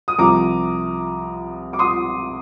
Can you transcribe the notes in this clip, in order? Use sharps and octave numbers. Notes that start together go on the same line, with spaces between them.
D#6
C2 C3 F3 A#5 D6
D6
C6 D#6